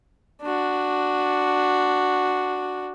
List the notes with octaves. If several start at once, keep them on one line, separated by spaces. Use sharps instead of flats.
D4 F#4